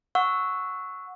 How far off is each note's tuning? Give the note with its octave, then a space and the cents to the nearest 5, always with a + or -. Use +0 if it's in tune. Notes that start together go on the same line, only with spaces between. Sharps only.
F#5 -15 C#6 +0 E6 -10